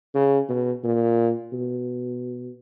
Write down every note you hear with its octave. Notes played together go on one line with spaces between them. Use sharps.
C#3
B2
A#2
B2